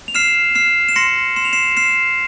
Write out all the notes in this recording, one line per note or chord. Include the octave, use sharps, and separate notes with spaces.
F7
F6 C7 E7
F6 C7 E7
E7
C6 A#6 C#7
C6 E7
F7
C7 E7
F6 C7 E7